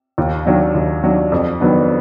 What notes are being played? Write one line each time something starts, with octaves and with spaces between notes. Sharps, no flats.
D#2
D#3 F#3 D4
D#2
D#3 F#3 D4
F2
D#3 F#3 B3 D4